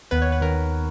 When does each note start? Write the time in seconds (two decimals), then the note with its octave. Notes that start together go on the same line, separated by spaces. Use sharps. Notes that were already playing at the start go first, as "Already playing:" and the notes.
0.11 D#2 B3 B4
0.22 C#5
0.32 B4
0.41 D#3 A#4